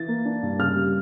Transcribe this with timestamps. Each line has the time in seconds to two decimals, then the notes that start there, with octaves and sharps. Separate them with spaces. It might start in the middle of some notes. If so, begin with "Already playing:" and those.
Already playing: E3 A6
0.08 A#3
0.25 D4
0.42 G2
0.59 C#3 F6
0.77 G3